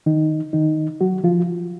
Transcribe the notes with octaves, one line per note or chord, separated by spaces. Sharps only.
D#3 D#4
D#3 D#4
F#3 F#4
F3 F4